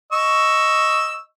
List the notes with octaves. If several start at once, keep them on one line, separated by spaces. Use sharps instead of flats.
D#5 C#6 E6